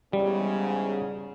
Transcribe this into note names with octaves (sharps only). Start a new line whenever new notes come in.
E2 G#2 C#3 G3